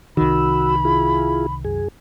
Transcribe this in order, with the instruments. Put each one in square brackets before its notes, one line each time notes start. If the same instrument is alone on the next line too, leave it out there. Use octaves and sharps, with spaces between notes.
[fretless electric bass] C2 D#3 [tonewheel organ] F#4 E6 [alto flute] B5
[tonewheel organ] E4 F4 G#4
F#2 G#4